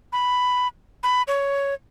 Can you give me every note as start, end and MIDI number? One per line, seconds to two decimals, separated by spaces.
0.13 0.68 83
1.03 1.22 83
1.28 1.74 73